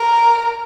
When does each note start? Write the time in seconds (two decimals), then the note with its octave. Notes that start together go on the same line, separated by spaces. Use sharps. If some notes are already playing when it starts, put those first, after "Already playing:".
Already playing: A#4